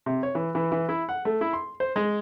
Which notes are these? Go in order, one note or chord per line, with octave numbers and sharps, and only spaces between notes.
C3
C#5
E3
E3
E3
E4
F#5
A3
E4
C6
C5
G#3